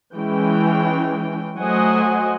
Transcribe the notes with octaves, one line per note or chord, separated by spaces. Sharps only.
E3 G#3 C#4 G5
F#3 A3 C5 D#5 F#5 G#5